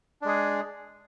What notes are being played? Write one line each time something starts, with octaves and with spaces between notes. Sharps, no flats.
G#3 D4 G#4